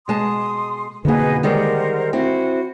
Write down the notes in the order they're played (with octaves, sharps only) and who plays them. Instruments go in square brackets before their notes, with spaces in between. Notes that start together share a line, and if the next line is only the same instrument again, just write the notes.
[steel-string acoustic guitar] B2 G#3 A5 [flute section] C6 D#6
[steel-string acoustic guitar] F2 B2 [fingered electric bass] D3 A#3 [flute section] D#4 G#4 B4
[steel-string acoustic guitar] D#3 G3 G#3 [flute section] A#4 C5 F#5
[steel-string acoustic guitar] C4 E4 [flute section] F#4